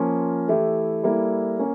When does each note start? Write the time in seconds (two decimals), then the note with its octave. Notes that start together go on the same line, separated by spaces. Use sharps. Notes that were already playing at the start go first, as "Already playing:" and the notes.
Already playing: F3 A#3 C#4 F4
0.48 E3 A3 E4 G4
1.03 G3 A#3 E4 A4
1.59 A#3 C#4